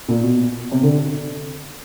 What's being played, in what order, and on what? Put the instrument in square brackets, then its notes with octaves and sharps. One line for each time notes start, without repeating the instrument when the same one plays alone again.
[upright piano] A#2
B2
C3
D3